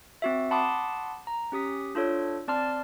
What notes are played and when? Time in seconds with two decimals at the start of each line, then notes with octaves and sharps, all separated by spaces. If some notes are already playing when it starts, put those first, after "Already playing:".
0.22 C4 F#4 E5
0.51 F#5 A5 B5 C6 D6 D#6
1.27 A#5
1.52 C#4 G4 D#6 B6
1.95 D4 F4 A4 C#5
2.48 C4 D5 A5 C6 F6